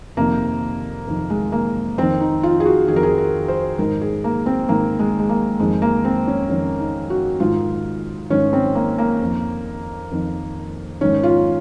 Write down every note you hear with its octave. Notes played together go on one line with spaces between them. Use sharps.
F2 C3 D#3 A#3
F2 C3 D#3
G#3
A#3
F2 D#3 C4
D#4
F4
G#4
F#4
F2 D#3 G#4 A#4
G#4
A#4
C5
G#2 D#3 A#4
G#4
A#3
C4
G#2 D#3 A#3
G#3
G#3
A#3
F2 D#3 G#3
A#3
C4
C#4
F2 D#3 C#4
D#4
F#4
G#2 D#3 F4
G#2 D#3 C#4
C4
A#3
A#3
F2 D#3
F2 D#3
G#2 D#3 C#4
F4